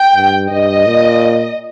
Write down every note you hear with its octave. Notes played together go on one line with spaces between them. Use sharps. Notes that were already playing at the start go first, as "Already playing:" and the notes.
Already playing: G5
G2
G2 D#5
A#2